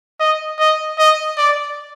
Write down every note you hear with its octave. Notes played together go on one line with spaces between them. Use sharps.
D#5
D#5
D#5
D5